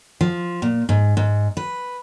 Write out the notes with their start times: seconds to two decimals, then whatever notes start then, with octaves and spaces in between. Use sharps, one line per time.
0.21 F3
0.62 A#2
0.89 G#2
1.17 G#2
1.57 B4